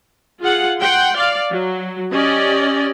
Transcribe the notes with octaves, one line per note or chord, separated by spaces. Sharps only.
F4 G#4 F5 F#5
F#5 G5 C6
D5 F5
F#3
C#4 G4 D5 D#5